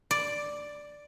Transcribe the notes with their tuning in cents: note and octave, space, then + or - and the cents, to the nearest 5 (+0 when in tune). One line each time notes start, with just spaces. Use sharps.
D5 +0